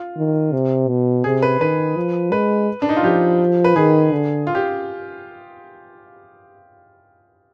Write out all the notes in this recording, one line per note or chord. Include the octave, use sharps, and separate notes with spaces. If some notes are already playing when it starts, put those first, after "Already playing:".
Already playing: F4
D#3
C3
B2
C3 G#4
B4
D#3 B4
F3
G#3 B4
D4
D#4
F4
F3 G4
B4
D#3 G#4
D3
F4
G4